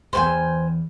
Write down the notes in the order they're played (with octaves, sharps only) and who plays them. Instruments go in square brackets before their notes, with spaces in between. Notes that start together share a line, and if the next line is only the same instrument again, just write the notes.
[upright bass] E2 E3 [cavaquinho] C5 G5 G#5